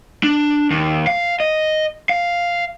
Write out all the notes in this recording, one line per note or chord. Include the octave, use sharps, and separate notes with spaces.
D4
D#2
F5
D#5
F5